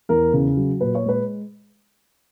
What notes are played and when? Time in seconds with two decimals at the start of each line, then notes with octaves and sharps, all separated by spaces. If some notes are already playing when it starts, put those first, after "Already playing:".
0.09 E2 A#4
0.33 C#3
0.57 F#3
0.81 A#2 B4
0.95 C#5
1.05 G#3 B4